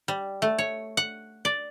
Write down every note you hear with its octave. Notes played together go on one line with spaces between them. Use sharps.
G3
A3
C#5
F#5
D5